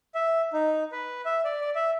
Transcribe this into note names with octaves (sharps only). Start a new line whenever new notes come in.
E5
D#4
B4
E5
D5
D5
E5